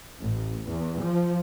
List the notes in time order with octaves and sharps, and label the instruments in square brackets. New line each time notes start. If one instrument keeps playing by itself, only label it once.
[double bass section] A1
E2
F3